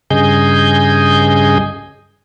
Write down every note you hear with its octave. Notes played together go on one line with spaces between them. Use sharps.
G2 C#3 G#4 D#5 G#5 G6